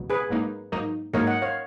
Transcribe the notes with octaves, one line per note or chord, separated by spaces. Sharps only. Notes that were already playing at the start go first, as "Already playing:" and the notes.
Already playing: C#2 B2 F#3
G#4 B4
G#2 F#3 A#3 D#4
G#2 F#3 A#3 D#4
G#2 F#3 A#3 D#4 A#4 C#5
D#5 F#5
C#5 F5